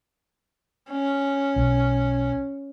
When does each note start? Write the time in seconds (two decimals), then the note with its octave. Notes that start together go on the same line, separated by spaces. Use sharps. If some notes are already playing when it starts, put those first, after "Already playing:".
0.90 C#4
1.56 B1